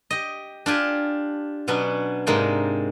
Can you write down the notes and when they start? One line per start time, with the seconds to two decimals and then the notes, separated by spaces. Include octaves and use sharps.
0.10 G4 D#5
0.66 D4 F4 G4 G#5
1.68 B2 F#3 B3 C#4 D4
2.27 G#2 C3 G#3 A#3 D4 G5